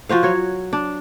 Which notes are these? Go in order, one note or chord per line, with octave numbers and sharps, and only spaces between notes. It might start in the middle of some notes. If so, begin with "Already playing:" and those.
F3 F#4 C5 F5
F#3 C#5
D4